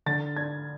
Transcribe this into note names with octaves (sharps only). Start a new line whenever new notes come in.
D3 A6
D4 G#6